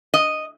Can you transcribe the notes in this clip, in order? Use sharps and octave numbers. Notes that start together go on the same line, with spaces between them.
D#5